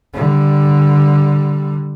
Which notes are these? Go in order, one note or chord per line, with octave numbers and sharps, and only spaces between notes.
D3 G3